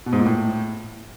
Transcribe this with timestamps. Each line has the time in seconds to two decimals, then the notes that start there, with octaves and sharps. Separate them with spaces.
0.06 B2
0.13 G#2
0.19 A#2
0.26 A2